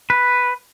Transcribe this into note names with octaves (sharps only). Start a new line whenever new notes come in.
B4